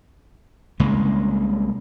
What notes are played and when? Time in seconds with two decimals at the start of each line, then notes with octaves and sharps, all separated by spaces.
0.80 C2 C#3 G#3 A#3